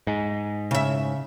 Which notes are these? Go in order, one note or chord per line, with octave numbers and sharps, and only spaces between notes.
G#2
C#3 E5